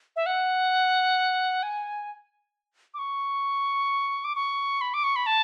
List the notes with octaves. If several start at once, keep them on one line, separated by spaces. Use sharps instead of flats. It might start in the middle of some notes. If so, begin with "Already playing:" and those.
E5
F#5
G#5
D6
C#6
D6
C#6
B5
D6
C#6
B5
A5